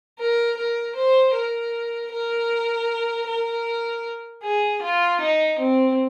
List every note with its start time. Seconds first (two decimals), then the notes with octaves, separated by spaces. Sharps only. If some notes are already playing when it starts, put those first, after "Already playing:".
0.19 A#4
0.57 A#4
0.96 C5
1.34 A#4
2.12 A#4
3.28 A#4
4.44 G#4
4.82 F4
5.21 D#4
5.59 C4